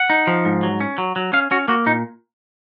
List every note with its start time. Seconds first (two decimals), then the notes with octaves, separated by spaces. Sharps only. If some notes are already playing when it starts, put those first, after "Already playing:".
Already playing: F#5
0.10 D#4
0.27 F3
0.45 G#2
0.63 F#3
0.80 C#4
0.98 F#3
1.16 F#3
1.33 C#4 F5
1.51 C#4 F#4
1.68 A#3 F#4
1.86 A#2 D#4